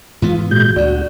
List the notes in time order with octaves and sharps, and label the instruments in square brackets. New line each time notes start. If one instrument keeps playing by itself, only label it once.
[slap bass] G#2 E3 B3 [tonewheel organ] F4
[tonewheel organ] A#2 G#3 G6 [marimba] F#4
[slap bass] D2 [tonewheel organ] F#4 [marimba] D5